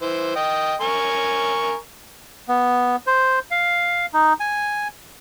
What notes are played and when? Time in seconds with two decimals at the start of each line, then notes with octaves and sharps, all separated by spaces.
0.02 E3 C5
0.36 D#5 G5
0.81 A#4 G#5 C#6
2.48 B3
3.07 C5
3.51 F5
4.13 D#4
4.40 G#5